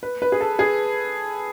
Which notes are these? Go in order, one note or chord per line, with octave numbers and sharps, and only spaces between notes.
B4
B4
G#4
A4
G#4